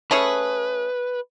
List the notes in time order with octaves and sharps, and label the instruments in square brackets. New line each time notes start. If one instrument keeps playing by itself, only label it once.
[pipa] A3 C#4 G#4 [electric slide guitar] B4